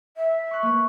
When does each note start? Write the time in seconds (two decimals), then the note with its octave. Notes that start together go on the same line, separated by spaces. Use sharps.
0.17 E5
0.51 C#6 F#6
0.63 A#3 B4